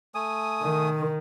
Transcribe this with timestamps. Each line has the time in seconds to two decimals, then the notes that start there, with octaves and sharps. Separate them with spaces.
0.15 A3 G#5 D#6
0.63 D#3